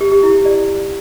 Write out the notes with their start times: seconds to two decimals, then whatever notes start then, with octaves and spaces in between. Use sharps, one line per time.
0.01 G4
0.12 G4
0.23 E4
0.34 G4
0.45 D5